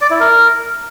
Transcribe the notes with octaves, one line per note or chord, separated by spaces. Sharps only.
D5
E4
A#4